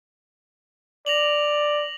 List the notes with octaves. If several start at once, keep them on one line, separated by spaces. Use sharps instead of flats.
D5 A#6 F7 F#7